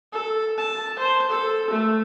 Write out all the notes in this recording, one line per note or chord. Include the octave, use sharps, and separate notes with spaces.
A4
A5
C5
A4
A3